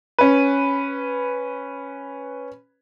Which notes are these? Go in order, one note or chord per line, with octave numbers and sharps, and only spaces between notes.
C#4 B4